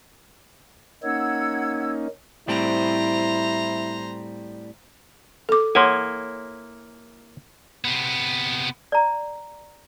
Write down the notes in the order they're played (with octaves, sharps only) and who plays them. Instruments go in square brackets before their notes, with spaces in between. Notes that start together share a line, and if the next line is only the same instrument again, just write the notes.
[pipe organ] A#3 C#4 D#4 [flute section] F#5 E6 G#6
[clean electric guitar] A2 G3 C4 [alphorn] E4 [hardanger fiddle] C5 A#5
[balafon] A4 D6
[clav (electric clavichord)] A#3 E4 G#5 [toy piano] A4 C#5 C6 [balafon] F#5
[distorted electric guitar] C3 B3
[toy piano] D5 A#5